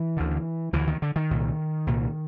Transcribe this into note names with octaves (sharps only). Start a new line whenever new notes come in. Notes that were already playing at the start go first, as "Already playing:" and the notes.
Already playing: E3
D2 D3
D2 D3 E3
D#3
D3
D#3
C2 A#2
C2 A#2